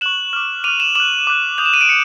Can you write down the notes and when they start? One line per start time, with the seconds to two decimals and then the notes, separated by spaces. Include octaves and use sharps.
0.01 C#6 F#6 E7 F#7
0.33 D6 F6
0.64 D6 F6 D#7 F7
0.80 E7 F#7
0.95 D6 F#6 E7 F#7
1.27 D6 F#6
1.58 D#6 G6 F7
1.66 E7
1.74 D#7
1.81 D7 E7
1.89 C#7